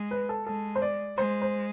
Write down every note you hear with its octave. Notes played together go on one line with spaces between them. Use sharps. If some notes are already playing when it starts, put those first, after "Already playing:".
Already playing: G#3
B4
A4
G#3 A4
C5
D5
G#3 C5
C5